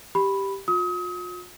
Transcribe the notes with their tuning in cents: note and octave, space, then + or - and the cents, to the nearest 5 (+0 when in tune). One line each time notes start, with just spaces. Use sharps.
G4 +0 B5 +0
F4 +40 D#6 +35